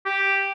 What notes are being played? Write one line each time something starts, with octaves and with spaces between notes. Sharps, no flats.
G4